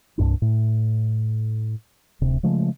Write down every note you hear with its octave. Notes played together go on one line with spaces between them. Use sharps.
C2 G2 D4
A2
D1 C3
C#3 F3 G#3 A3